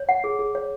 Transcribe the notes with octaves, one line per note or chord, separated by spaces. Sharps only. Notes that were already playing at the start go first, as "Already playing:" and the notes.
Already playing: C#5
F#5
G#4
G#4
C#5